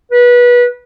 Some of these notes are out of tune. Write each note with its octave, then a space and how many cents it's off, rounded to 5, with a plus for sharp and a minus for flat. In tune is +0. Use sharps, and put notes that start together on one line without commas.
B4 -25